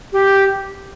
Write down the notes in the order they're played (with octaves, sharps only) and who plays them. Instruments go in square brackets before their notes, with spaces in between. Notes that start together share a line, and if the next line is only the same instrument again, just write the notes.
[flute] G4